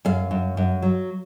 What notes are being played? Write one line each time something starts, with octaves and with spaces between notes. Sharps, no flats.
F#2 F5
F#2
F#2
F#3